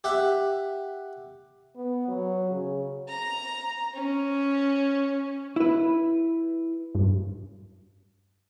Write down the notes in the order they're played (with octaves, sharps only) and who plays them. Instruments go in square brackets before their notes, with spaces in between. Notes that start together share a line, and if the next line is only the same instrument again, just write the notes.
[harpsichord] G4 E5 F#5
[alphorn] B3
F#3
C#3
[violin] A#5
C#4
[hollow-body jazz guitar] E4 B4
[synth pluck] G2